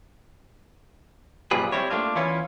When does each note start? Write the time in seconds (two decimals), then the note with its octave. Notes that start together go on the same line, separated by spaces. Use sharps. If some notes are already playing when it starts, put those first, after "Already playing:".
1.51 F#2 A#2 F3 G3 G#4 B4
1.72 G3 C4 E4 C#5
1.90 A3 A#3 D4 F4
2.16 E3 B3 C#4 E4 F4 C#5